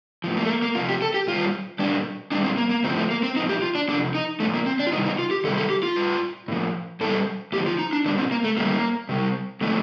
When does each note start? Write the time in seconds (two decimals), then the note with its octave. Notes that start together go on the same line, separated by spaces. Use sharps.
0.24 A2 F3
0.37 A#3
0.43 A3
0.50 A#3
0.62 A#3
0.75 C3 F3 F4
0.89 G4
1.02 A4
1.14 G4
1.28 A#2 G3 F4
1.79 A#2 G3 D4
2.32 A#2 G3 D4
2.44 C4
2.57 A#3
2.70 A#3
2.84 A2 F3 C4
2.98 A3
3.10 A#3
3.23 C4
3.36 A#2 F3 D#4
3.49 G4
3.62 F4
3.75 D4
3.88 C3 F3 D4
4.15 D#4
4.40 A#2 F3 A3
4.54 A#3
4.66 C4
4.79 D4
4.87 F4
4.92 C3 D#4
4.95 D#3 G3
5.06 D#4
5.19 F4
5.31 G4
5.44 C3 D#3 G3 A4
5.58 A4
5.70 G4
5.83 F4
5.96 A2 G3
6.48 A2 F3
7.01 A#2 G3 A4
7.52 A2 G4
7.56 F3
7.66 F4
7.79 D#4
7.93 D4
8.06 A#2 G3 D4
8.18 C4
8.31 A#3
8.44 A3
8.57 A2 G3 A#3
9.09 C3 G3
9.61 A#2 F3 A3